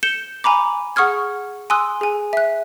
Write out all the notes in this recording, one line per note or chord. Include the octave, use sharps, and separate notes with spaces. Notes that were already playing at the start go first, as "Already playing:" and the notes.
G6 C#7 E7 G7
G#5 A#5 B5 D6
G#4 F#5 C#6 D#6 F6 G#6
G#5 C6 D#6 E6 F#6
G#4 G#5
E5 F#6